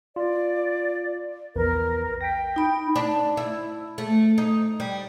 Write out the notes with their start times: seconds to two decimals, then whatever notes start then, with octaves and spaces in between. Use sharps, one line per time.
0.16 F4 D5
1.56 A#1 E2 A#4 B4
2.21 G5 A#6 B6
2.56 D#4 B5
2.96 D4
3.37 E4
3.98 A3
4.38 D#4
4.80 G3